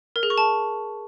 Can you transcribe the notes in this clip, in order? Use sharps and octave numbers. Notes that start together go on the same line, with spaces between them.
A#4
G#4
C#6
A5